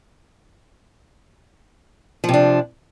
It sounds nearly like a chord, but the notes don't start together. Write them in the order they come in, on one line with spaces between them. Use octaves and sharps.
F3 C3 D4